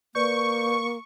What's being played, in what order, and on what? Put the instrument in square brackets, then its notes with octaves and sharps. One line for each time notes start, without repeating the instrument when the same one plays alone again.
[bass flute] A#3 [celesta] B4 D5 G6 [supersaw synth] C#6